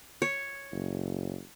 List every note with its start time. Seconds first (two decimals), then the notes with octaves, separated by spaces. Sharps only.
0.22 C#5
0.72 F#1